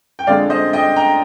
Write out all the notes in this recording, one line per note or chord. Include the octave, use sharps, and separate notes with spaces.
G5
F2 D3 G#3 D5 F5
C5 D#5
D#5 G5
G5 A#5